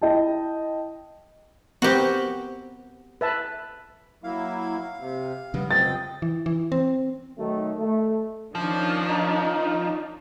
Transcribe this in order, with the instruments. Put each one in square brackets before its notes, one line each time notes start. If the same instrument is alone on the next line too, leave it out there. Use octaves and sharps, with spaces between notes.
[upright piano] E4 D#5 G5 A5
[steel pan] B3 C4 A#4 [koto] F#4 G4
[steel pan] B4 E5 A5
[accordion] F#3 A#3 E4 [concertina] F5
[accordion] C3
[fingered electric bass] C#3 F#3 G3 [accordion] B3
[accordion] C4 [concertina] D#5 G5 [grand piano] A6
[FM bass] E3
E3
C4
[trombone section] D#3 F#3 A3 D#4
A3
[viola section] D#3 C#4 D4 [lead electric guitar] F3
[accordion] D#4